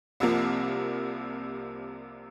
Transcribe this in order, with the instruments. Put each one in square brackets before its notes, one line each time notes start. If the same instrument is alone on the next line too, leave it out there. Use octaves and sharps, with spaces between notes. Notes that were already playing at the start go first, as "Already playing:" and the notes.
[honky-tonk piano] C2 C3 F3 A#3